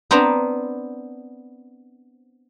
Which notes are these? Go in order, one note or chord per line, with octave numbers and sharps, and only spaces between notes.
B3 C4 D4 C5 A#5